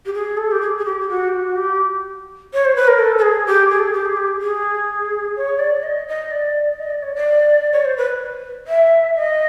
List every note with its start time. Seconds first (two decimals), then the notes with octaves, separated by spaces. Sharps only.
0.06 G4
0.14 G#4
0.37 A4
0.52 G4
0.61 G#4
0.77 G#4
0.85 G4
1.00 G4
1.09 F#4
1.28 G4
1.33 F#4
1.56 G4
2.54 C#5
2.65 C5
2.76 B4
2.87 A#4
2.99 A4
3.18 A4
3.22 G#4
3.47 G4
3.70 G#4
3.80 A4
3.86 G#4
3.93 G4
4.05 G#4
4.17 G4
4.41 G#4
5.37 C#5
5.59 D5
5.83 D#5
6.08 D#5
6.31 D5
6.78 D#5
6.90 D5
7.03 C#5
7.15 D5
7.73 C#5
7.85 C5
7.97 B4
8.67 E5
9.16 D#5